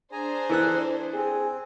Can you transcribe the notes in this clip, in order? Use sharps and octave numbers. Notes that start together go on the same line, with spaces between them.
D4 G#4 C5 G#5 A#5
E3 A4 F#6
C4 G#4